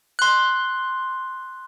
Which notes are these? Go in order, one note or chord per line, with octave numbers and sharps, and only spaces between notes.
C6 F#6